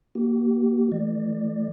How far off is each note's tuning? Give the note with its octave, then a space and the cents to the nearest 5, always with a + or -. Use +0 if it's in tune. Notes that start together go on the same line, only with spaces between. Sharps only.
A#3 +10 G4 -35
E3 +5 A3 -10 D5 +20